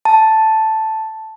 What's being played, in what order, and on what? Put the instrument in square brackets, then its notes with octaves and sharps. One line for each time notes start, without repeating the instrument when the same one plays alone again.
[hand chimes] A5